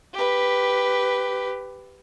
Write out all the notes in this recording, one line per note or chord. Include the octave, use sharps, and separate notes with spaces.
G4 B4